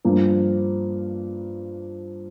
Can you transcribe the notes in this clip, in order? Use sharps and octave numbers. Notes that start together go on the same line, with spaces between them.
G2 F3 A#3